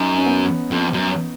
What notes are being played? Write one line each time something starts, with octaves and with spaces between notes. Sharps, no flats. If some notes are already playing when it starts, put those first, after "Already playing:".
Already playing: F#2 D#4
C#4
B3
F2
F#2